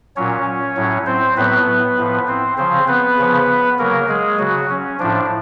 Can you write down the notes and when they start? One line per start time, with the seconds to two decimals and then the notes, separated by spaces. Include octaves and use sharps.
0.16 A#2 F#3 C#4 C#5
0.76 A2 F#3
1.06 C4 C5
1.37 A2 F#3 B3 B4
1.98 A2 F3
2.28 C4 C5
2.58 C#3 F3 C4 C5
2.88 B3 B4
3.18 C#3 F3
3.79 C#3 F#3 A#3 A#4
4.09 G#3 G#4
4.38 C#3 F#3 F#4
4.70 C#4
4.99 A2 F3 D4